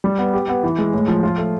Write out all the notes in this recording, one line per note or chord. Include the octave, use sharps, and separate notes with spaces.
G3
B3
G4
B3
E3
G#3
A2
F3
F4
A3